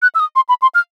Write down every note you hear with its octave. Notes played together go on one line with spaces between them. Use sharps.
F#6
E6
D#6
C6
B5
C6
F6